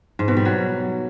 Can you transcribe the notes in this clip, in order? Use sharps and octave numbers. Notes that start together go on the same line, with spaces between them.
G#2
B2
G3
F#3